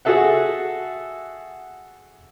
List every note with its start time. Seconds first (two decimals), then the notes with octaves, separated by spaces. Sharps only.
0.05 F#4 G#4 A4 E5 F#5